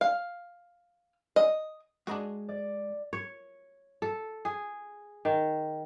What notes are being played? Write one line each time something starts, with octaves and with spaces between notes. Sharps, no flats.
F5
D#5
G#3 D4 F#4 G#4 A#5
D5
C#5
A4
G#4
D#3